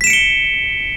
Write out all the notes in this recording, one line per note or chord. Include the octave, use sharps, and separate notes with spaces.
B6 C#7 D7 E7 G7